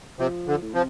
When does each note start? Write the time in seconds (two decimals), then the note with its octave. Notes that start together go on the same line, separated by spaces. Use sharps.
0.19 C3 F3
0.47 D3
0.62 A2
0.74 C3 F3